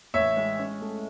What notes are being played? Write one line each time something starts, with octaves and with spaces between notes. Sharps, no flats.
A1 C#5 E5
G#3
C#4
A3